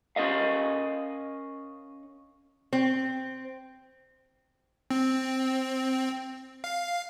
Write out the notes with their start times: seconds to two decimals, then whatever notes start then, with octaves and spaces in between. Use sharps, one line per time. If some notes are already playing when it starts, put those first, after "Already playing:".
0.16 C#4 A#4 D#5 F5
2.73 C4
4.91 C4
6.64 F5